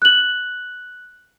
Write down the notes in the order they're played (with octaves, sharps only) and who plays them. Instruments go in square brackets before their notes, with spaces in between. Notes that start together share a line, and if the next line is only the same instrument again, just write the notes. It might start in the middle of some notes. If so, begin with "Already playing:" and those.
[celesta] F#6 F#7